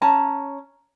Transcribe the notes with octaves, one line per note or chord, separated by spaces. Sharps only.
C#4 A5 A#5